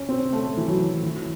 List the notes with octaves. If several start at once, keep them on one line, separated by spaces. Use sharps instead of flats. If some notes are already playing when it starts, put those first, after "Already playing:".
Already playing: C#4
C4
A3
E3
F#3
E3